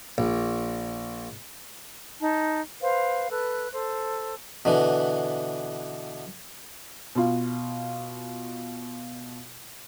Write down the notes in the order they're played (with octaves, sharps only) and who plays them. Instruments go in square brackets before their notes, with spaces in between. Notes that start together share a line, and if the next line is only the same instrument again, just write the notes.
[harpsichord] A#1
[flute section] D#4 A5
B4 C5 F5
A4 B4 F#6
A4 C5
[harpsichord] B2 D3 E3
[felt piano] B2 F4